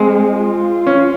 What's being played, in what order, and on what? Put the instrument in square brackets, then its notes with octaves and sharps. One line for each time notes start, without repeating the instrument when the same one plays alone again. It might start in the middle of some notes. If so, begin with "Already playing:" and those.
Already playing: [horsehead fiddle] G#3 [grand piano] C4
[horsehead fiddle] F4
[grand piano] C#4